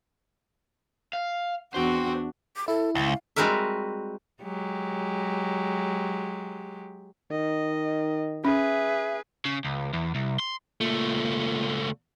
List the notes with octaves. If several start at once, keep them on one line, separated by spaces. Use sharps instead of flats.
F5
E2 D4 F#4 C5 G5
D6
E4 A4
C#2 F5
G3 G#3 C4 F#4 A#4 E5
F#3 G#3 G4
D#3 D#5
C#4 G#4 B4 E5
C#3
C#2
E2
C2
C6
C#2 A#2 A3